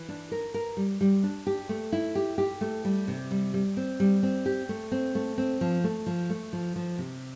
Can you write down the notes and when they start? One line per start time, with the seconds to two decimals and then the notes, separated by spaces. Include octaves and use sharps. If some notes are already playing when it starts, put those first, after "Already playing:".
Already playing: E3
0.08 D4
0.32 A#4
0.54 A#4
0.77 G3
1.01 G3
1.23 D4
1.47 G4
1.69 A3
1.92 E4
2.15 G4
2.38 G4
2.61 A3
2.85 G3
3.08 C3
3.31 G3
3.54 G3
3.77 C4
4.00 G3
4.23 C4
4.46 G4
4.69 A3
4.92 C4
5.15 A3
5.38 C4
5.61 F3
5.84 A3
6.06 F3
6.30 A3
6.53 F3
6.76 F3
6.98 C3